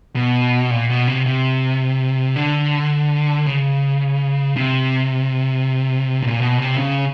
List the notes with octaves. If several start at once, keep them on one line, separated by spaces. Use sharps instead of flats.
B2
A#2
B2
C3
C3
D3
C#3
C3
A#2
B2
C3
C#3